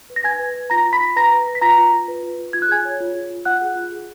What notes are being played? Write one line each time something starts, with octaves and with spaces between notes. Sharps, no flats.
B4
A#6
B4 G#5 G#6
B4
B4
F4 A#5 A#6
F4
B5 B6
F4
B4 A#5 A#6
B4
B4
B6
F4 A#5 A#6
F4
F4
B4
F4
F4
F4 G#6
F#6
G#4 G#5 G#6
C#5
F4
F4
F4
F4 F#5 F#6
G#4
F4
G#4